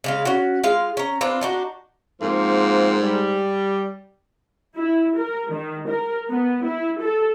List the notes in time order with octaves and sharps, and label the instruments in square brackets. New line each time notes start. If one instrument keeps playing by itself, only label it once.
[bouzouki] C#3 G#3 F5
C#4 F#4
G#3 F4 F5
C#4 A#5
C4 D4 F4 B4
D4 D#4 F#4
[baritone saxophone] G#2 [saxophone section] F3 A#3 C4
[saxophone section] G3
[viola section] E4
A#4
D#3
A#4
B3
E4
A4